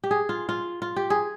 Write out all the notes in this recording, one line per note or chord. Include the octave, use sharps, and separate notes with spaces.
G4
G#4
F4
F4
F4
G4
G#4